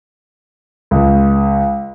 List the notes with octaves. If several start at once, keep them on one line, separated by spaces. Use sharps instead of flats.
C#2